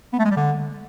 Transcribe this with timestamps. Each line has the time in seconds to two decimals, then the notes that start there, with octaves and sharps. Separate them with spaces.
0.13 B3
0.19 A3
0.25 G#3
0.31 G3
0.37 D3